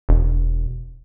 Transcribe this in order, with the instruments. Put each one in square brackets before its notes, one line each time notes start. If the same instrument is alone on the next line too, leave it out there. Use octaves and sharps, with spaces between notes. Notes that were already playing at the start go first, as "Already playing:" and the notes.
[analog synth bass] E1